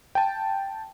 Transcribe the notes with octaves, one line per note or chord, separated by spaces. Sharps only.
G5 A5